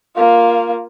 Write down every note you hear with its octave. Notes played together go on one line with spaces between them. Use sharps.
A#3 F4